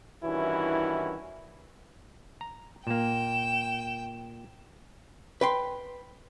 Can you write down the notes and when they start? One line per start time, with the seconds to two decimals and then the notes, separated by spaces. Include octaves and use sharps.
0.24 G2 D#3 E3 C#4 E4 F#4
2.41 A#5
2.87 A#2 A#3 G5 E7
5.41 B4 G5 C6